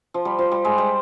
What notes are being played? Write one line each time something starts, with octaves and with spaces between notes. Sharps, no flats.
F3
G3
F3
G3
G#3
G3